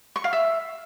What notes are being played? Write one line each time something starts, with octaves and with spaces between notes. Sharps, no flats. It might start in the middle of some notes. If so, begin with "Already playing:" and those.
C#6
F5
E5